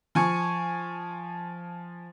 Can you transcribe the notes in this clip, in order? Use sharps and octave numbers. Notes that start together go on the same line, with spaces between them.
F3 G#5 C#6